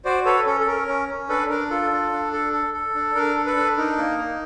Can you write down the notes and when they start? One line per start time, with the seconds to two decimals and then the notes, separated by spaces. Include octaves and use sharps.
0.05 F#4 C5 D5
0.25 A4 B4 C#5
0.46 C#4 A4
0.61 A4
0.66 C#4 A#4
0.88 C#4
1.08 C#4
1.29 D4 A4 B4
1.49 D4 A#4
1.70 F4 A4
1.91 D4
2.12 D4
2.33 A4
2.53 A4
2.74 A4
2.95 D4
3.15 D4 A#4
3.36 A4
3.46 A4 B4
3.56 D4
3.77 D#4 A#4
3.98 A#3
4.18 D#4